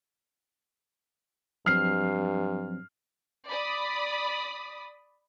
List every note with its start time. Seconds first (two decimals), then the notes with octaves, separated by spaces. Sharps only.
1.66 G2 F3 F#3 C4 F6 C7
3.49 D5 B5 D#6